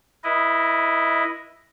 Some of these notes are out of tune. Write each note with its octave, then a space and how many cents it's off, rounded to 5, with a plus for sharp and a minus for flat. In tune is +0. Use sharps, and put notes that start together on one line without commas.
E4 +0 B4 -35 D#5 +0